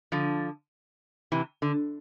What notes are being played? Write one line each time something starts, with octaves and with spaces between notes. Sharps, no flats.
D3 F3
C3 E3
D3